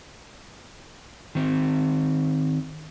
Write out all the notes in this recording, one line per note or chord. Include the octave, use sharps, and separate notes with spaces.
D#3 C4